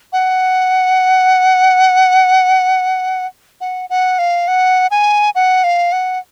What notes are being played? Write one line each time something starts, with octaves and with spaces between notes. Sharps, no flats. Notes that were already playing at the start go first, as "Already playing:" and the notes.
F#5
F#5
F#5
F5
F#5
G#5
F#5
F5
F#5